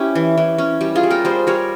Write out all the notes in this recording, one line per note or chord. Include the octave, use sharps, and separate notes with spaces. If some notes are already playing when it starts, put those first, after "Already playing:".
Already playing: C#4 E4 G4
E3
E3
C#4
G3 G4
F4 G#4
G3
G4 A#4
G3 G#4 C5
G3 A#4 C#5